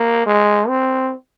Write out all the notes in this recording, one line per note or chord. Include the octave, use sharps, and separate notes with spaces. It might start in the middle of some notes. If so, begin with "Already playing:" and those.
Already playing: A#3
G#3
C4